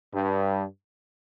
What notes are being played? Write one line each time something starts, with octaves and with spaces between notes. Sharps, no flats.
G2